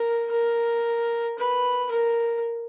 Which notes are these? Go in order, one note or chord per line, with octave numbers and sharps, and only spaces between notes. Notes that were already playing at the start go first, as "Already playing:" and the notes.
Already playing: A#4
A#4
B4
A#4